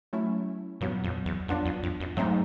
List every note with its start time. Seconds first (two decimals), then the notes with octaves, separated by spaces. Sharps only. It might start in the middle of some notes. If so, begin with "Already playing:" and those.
0.13 F#3 A3 C#4 E4
0.81 G2 A#2 F#3 B3
1.04 F2
1.26 E2
1.48 F2 F#3 B3 D4 F4
1.65 F2
1.83 F2
2.00 F#2
2.17 G#2 F#3 A3 C4 D#4